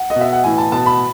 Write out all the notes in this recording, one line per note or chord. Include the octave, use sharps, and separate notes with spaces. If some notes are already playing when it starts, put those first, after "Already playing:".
Already playing: F#5
D#5
B2
E5
F#5
A2 E3 G#5
A5
B2 A5
B5